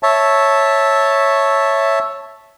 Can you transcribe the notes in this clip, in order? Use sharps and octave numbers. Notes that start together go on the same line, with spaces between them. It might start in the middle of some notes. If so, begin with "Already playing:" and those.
C#5 E5 A5